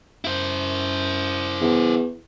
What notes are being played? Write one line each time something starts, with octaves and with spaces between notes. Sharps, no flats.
F#2 E4 C5
E2